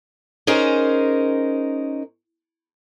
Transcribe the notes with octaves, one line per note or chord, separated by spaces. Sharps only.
C#4 D#4 G#4 A#4 C5